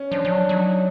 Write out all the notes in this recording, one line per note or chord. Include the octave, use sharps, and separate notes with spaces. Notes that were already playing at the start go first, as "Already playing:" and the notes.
Already playing: C#4
F3 D4
F3 C#4
F#3 D4
F#3 D#4